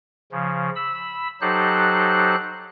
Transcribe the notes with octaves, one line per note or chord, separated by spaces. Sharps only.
C#3 F3
B5 E6
F#3 D#4 G4 A4 C5 F#6